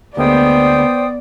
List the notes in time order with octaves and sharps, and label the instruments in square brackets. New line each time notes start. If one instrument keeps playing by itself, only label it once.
[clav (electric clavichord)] D2 G#3 A#3 [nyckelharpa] B3 [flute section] C5 G5 D#6 [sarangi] D5